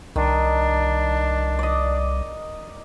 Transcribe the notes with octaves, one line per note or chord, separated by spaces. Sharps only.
C2 D#3 D4
D5 D#5